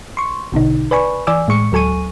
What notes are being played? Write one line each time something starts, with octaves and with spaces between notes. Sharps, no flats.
C6 C#6
A#1 B2 D3 D#4
B4 D5 G#5 B5 C#6
E3 D5 G#5 D6 E6
A2 G#3 C#6 C#7
D2 F#3 A4 G#5 C#6 D#7